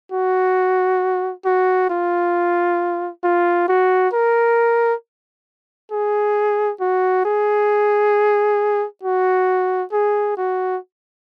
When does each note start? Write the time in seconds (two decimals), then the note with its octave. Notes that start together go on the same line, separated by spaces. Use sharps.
0.12 F#4
1.45 F#4
1.90 F4
3.24 F4
3.68 F#4
4.13 A#4
5.92 G#4
6.81 F#4
7.25 G#4
9.03 F#4
9.93 G#4
10.37 F#4